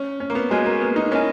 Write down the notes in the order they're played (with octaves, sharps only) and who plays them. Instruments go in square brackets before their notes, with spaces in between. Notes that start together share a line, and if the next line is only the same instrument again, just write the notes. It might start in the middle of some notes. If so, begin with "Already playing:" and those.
Already playing: [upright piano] C#4
C#4
A#3
B3
[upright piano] G#3 [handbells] C#4 F#4 A#4 C#5 G#5
[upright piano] A#3
B3
D#4
[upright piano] C#4 [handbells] E4 A#4 D#5 G#5